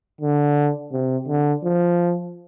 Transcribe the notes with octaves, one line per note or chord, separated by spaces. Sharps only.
D3
C3
D3
F3